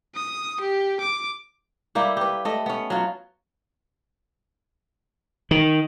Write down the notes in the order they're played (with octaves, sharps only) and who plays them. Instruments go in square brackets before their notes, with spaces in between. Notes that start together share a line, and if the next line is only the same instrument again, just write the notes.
[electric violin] D#6
G4
D6
[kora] G3 A#3 E4 G4
G4 B4
A3 D#5
B3 C#4
F#3 F4
[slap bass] D#3